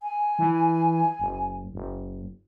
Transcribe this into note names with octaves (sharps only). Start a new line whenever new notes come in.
G#5
E3
F#1
F#1